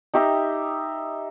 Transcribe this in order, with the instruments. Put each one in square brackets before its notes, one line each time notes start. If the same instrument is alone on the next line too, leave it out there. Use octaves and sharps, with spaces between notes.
[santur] D#4 G4 E5 A#5